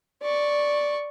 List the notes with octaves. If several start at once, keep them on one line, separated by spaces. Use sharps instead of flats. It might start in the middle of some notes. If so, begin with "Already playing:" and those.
D5 C#6